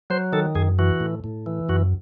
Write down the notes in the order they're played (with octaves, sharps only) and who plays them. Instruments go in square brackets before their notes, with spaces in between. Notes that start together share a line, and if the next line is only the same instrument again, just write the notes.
[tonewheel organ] F#3 C5
D#3 A4
F#2 G#4
E3 F#4
A2
A2
E3
F#2 F#4